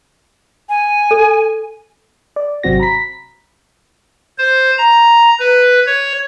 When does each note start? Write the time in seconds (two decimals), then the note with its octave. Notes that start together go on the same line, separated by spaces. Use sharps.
0.69 G#5
1.11 A4
2.36 D5
2.63 G#1 C3 F#3 C4 F#4 A#6
2.80 A#5 B5 B6
4.38 C5
4.78 A#5
5.40 B4
5.86 C#5